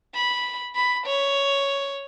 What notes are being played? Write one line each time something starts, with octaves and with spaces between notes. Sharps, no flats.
B5
B5
C#5